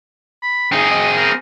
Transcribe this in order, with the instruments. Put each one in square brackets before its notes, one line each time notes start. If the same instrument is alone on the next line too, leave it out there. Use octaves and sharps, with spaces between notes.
[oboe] B5
[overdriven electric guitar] C4 G#4 [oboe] D#4
[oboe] D#5
A#4